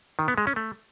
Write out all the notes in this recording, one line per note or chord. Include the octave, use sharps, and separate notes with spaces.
D#3
B3
G#3
C#4
A3